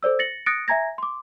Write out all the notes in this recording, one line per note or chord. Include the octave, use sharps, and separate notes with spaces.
A4 C5 D5 E6
A6 A#6 C#7 F#7
D#6 F#6 A6 A#6 C#7 D7
E5 G#5 A#5 G#6 A#6
C6 D6